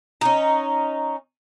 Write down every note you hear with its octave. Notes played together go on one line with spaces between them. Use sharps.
C#4 D#4